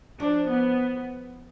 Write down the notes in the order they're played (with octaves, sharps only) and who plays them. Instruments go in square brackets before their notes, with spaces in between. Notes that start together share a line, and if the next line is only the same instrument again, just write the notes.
[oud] F3 [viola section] D4
[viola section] B3